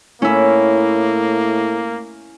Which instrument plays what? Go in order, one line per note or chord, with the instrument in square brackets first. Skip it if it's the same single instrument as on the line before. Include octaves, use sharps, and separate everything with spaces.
[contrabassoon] A2 [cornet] A#3 [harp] C#4 E4